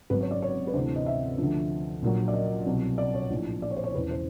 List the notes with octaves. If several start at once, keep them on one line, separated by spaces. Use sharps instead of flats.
G#1 F#2 C#3 F#3 B4
C#5
D5
C#5
B4
D2 C3 E3 C5
D#5
E5
D2 D3 F3
A#1 A#2 F#3
D5
D#5
C2 B2 F#3
D5
C#5
A#1 A2 F3
D5
C#5
C5
C#5
E1 E2 C#3 E3 B4
C5